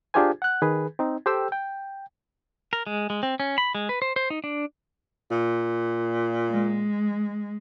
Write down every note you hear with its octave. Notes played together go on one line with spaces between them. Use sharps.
D4 F4 G4 G#4 C5 G#5
F#5 F#6
D#3 G#4 B4
C4 D#4
G4 A4 C5 G5 E6
G5
A#4
G#3
G#3
C4
C#4
B5
G#3
B4
C5
C5
D#4
D4
A#2
G#3